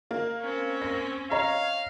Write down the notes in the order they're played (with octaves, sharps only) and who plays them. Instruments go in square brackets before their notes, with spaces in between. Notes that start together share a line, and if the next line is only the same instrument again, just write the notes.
[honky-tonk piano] A#3
[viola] C4 C#4
[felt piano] A#6
[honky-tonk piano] C#5 [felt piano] D#5 A#5 [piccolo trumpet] F5